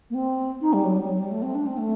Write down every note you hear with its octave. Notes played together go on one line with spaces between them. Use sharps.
A#3
C4
D#4
G3
F#3
G3
F#3
G3
A3
C4
D4
C4
A3